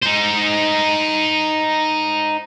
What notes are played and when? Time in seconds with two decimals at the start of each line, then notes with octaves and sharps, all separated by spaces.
0.02 D#4 C5